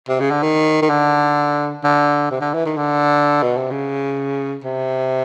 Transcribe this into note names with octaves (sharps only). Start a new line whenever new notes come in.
C3
C#3
D3
D#3
D#3
D3
D3
C3
D3
E3
D#3
D3
B2
C3
C#3
C3